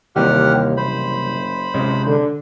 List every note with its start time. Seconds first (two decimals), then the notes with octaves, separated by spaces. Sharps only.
0.16 D#2 C3 E3 G3 G4 F#5 F6
0.77 F#1 C5 B5
1.74 C3 G#3 C#4
2.07 D3